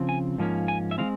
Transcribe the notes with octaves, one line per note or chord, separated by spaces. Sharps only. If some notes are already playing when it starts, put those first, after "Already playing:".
Already playing: C#3 F3 C4
G#5
G#2 F3 A#3 C#4
G#5
E5
E3 G#3 C4 F5